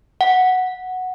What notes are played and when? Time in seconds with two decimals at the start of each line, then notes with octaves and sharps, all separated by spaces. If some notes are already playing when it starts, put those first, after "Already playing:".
0.21 F#5